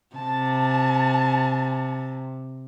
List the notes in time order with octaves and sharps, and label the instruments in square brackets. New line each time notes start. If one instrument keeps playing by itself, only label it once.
[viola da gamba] C3 [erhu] A5